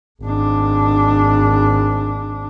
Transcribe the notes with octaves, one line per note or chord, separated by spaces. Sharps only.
G#1 D4